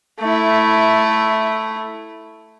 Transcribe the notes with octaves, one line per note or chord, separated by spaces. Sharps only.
A3 E4